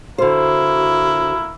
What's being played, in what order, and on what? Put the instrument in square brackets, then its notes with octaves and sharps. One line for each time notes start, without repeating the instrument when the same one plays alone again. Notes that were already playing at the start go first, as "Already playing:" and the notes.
[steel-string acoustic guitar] D3 C5 [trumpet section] A#3 E4 [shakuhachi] F#4